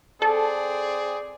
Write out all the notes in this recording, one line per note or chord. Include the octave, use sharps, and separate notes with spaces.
C4 G#4 A4 D5